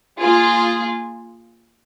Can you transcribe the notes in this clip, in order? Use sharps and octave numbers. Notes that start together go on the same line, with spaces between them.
A#3 F4 G#4